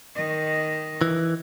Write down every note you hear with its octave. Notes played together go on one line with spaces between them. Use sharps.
D#3 D#5
E3